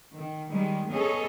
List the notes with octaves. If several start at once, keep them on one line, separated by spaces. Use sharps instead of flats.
D#3
D#3 G3 G#3
B3 C#4 G#4 A4 C#5 D#5